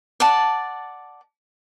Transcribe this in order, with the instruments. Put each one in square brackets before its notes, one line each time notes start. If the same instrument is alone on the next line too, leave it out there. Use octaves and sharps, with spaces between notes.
[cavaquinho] D5 F#5 A5